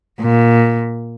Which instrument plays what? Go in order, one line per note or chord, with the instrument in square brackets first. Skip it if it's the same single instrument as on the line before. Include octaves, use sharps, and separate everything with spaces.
[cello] A#2